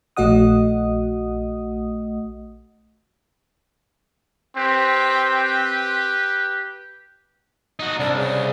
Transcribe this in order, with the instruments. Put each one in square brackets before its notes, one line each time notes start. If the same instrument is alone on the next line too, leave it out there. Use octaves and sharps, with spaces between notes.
[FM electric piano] A#1 A3 F#4 D#5 F#5 D#6
[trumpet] C4 [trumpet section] G4 B4
[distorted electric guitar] D#4 F#4
[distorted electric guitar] C2 [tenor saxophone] D4
[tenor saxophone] C#3